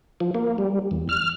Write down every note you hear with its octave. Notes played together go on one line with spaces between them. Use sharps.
F3
A#3
G3
E2
F6